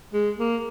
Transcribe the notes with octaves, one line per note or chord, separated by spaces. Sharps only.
G#3
A#3